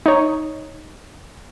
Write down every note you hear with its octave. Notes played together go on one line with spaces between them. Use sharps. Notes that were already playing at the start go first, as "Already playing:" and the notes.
D#4 C#5